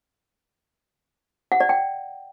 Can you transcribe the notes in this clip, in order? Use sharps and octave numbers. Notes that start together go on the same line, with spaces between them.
F#5
D5
G5